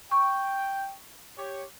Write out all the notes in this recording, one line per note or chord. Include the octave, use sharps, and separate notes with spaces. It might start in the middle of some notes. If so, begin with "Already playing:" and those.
G5 C#6
G4 C#5